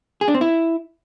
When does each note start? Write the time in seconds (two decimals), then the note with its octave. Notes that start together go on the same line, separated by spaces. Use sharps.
0.21 G#4
0.28 D4
0.35 C4
0.41 E4